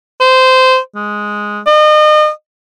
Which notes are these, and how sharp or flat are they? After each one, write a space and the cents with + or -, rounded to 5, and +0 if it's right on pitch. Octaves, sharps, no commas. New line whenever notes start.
C5 -15
G#3 +0
D#5 -35